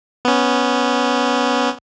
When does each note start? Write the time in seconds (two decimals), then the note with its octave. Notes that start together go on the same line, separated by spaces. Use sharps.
0.25 B3 C#4